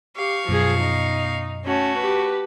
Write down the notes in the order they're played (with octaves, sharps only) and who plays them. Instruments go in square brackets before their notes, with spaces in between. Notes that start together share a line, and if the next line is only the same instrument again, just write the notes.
[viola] G4 [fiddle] F5 C#6
[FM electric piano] F#2 B2 [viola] F3 G#4
[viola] D#4
[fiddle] A3 F#4 [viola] C#4
[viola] G4 B4